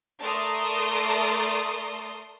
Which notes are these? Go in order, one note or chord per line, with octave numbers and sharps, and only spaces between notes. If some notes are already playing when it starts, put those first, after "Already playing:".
A3 A#4 D5 A5 C6 D#6